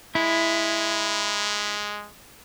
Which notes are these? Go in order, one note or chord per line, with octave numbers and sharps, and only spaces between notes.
G#3 E4